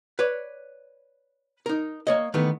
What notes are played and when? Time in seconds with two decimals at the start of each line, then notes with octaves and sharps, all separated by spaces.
0.19 B4 C#5 D5
1.66 D#4 A#4
2.07 A#3 C#5 D#5
2.34 D#3 E3 A3 B3